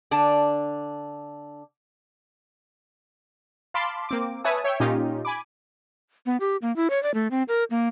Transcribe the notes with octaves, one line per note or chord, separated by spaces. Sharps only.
D3 D4 A5
F5 A5 B5 C6 D6
A#3 C4 D6
B4 C#5 E5 G#5 A5 D#6
C#5 E5 G5
A#2 C#4 D#4 F4 G4
G#5 B5 D6
B3
G4
A#3
E4
C#5
D5
A3
C4
A#4
A#3